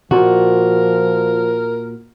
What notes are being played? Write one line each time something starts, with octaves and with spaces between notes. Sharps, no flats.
A#2 F3 F#4 A#4